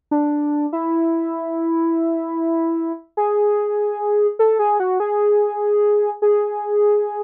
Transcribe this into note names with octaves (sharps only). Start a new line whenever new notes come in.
D4
E4
G#4
A4
G#4
F#4
G#4
G#4